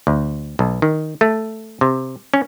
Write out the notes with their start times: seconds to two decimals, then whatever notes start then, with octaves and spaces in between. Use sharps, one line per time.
0.07 D2
0.59 B1
0.82 D#3
1.21 A3
1.81 C3
2.34 C#4